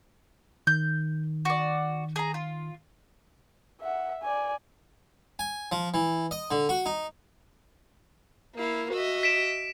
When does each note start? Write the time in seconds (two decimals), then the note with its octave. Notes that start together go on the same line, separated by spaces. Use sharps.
0.67 D#3 G6
1.45 F#4 D5
2.16 G#4 A#5
2.34 F4
3.81 E5 F#5
4.23 D5 G#5
5.39 G#5
5.72 F3
5.94 E3
6.31 D#5
6.51 D3
6.69 F#4
6.86 D#4
8.56 A#3 E4 F5
8.91 F#4 D#5 E5
9.23 B6 D7 E7